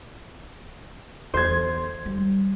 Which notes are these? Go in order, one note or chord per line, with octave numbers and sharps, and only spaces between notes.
E2 C5 G#6
G3